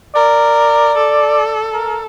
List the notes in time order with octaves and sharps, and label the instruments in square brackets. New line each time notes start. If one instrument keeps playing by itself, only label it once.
[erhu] A#4 [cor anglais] D5
[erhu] A4
[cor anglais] A#4